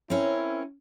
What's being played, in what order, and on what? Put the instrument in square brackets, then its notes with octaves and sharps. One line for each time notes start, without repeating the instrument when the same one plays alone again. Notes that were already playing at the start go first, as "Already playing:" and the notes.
[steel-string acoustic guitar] C4 C#4 A#4 [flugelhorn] E4